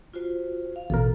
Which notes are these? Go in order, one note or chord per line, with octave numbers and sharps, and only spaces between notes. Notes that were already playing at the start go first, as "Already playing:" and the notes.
F4 F#4 C5
F5
A1 B2 A4 A#4